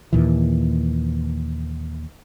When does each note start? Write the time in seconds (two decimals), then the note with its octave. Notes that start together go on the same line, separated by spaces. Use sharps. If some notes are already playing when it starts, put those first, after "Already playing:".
0.13 D#2 A#2 E3